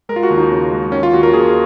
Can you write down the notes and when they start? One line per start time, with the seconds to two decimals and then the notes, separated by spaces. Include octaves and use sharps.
0.09 G#3 A#4
0.16 F4
0.23 F#4
0.30 D#2
0.37 D#4
0.51 C#3
0.72 G#3
0.92 D#3 C#4
1.03 F4
1.13 D#2 F#4
1.23 A#4
1.34 D#2 G#4